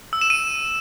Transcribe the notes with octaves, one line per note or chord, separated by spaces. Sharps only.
E6
E7
D#7